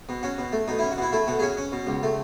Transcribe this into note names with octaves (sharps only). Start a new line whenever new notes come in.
B2
C#4 F#4
B2
A3
B2 D#4
C#4 E4
F#4
B2 E4
A3 E4
B2 F#4
G#4
C#4 F#4
C#4
B2
C#2
A3